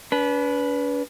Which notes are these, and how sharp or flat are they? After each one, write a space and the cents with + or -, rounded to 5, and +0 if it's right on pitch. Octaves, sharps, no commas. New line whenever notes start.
D4 -45 B4 -10